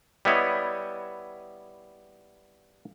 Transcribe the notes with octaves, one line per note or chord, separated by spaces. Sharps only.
G3 B3 E4 C#5 D#5